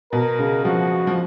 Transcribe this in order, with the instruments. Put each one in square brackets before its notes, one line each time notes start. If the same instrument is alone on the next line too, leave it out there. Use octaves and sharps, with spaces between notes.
[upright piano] B2 [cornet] A#4
[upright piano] C#3
[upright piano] F3 [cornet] F#4
[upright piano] F3